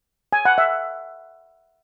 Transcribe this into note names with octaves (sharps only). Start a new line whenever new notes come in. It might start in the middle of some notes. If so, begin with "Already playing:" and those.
G#5
F#5
E5